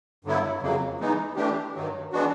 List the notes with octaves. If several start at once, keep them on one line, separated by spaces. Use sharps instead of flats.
G2 D3 F#3 B3 E4
F2 C#3 F#3 A#3
E3 G#3 B3 D#4
E3 A3 D4 G4
G2 D#3 F#3
E3 G#3 B3 D4 F#4